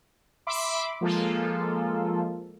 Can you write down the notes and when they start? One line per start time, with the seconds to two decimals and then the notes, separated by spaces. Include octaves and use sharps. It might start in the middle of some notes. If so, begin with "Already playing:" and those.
0.47 E5 B5 C6 D6
1.01 F3 G#3 A#3 F4 A4